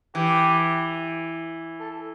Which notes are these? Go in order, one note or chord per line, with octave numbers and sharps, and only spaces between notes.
E3 G4
A4